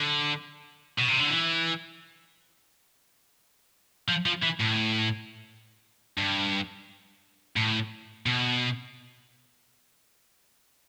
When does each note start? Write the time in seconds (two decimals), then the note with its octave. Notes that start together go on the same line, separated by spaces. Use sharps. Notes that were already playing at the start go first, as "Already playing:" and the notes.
Already playing: D3
0.98 B2
1.08 C3
1.19 D3
1.30 E3
4.08 F3
4.26 F3
4.43 E3
4.61 A2
6.18 G2
7.56 A2
8.26 B2